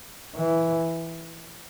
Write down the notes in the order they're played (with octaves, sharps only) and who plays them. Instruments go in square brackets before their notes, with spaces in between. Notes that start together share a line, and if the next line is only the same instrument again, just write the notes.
[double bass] E3